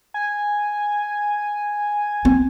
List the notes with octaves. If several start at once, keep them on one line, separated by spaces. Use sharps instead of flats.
G#5
C4